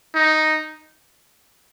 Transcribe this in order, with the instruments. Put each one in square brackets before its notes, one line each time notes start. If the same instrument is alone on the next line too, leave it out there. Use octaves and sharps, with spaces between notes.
[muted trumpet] D#4